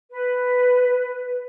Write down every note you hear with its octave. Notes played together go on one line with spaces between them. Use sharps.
B4